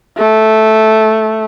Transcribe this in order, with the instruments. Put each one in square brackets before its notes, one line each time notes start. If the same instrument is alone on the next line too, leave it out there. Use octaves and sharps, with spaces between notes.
[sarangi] A3